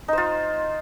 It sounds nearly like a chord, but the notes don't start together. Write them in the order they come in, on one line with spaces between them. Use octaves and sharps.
D#4 C5 F4